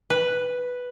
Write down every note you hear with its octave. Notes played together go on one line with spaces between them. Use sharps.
B4